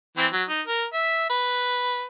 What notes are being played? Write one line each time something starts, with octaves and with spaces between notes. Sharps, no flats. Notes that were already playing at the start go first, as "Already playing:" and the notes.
E3 C4
F#3
D#4
A#4
E5
B4